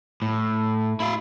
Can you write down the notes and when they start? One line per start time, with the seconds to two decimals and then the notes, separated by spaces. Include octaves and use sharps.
0.22 A2
1.00 E4 F5